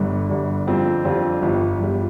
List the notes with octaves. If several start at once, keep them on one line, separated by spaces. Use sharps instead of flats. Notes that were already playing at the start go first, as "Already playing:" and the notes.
Already playing: G1 G2 D3
G1 G2 D3
F2 D3 G3 C4 F4
F2 D3 G3 C4 F4
G1 G2 G3 F4
G1 G2 G3 F4